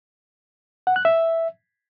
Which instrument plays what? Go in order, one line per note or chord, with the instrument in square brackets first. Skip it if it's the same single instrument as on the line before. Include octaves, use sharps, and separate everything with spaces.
[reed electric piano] F#5
F#6
E5